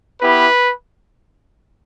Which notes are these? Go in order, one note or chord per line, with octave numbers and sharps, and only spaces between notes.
B3 E4 G4 B4